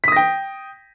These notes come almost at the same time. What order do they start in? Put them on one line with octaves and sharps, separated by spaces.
B6 D#6 A#6 G5